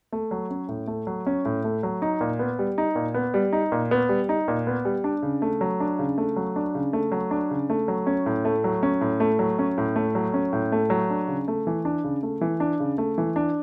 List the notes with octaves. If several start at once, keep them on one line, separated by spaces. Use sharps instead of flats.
A3
F#3
C#4
A2
A3
F#3
C#4
A2
A3
F#3
D#4
A#2
B3
G3
D#4
A#2
B3
G3
D#4
A#2
B3
G3
D#4
A#2
B3
G3
D4
C#3
A3
F#3
D4
C#3
A3
F#3
D4
C#3
A3
F#3
D4
C#3
A3
F#3
C#4
A2
A3
F#3
C#4
A2
A3
F#3
C#4
A2
A3
F#3
C#4
A2
A3
F#3
D4
C#3
A3
E3
D4
C#3
A3
E3
D4
C#3
A3
E3
D4